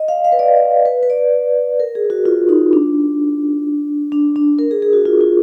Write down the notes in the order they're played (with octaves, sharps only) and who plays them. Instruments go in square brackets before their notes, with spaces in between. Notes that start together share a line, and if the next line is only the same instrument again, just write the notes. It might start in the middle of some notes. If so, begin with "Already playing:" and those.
Already playing: [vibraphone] D#5
F5
F5
B4
D5
B4
B4
D5
A#4
G#4
F#4
F4
D#4
D4
D4
D4
A#4
G#4
G#4
F#4
F4
F4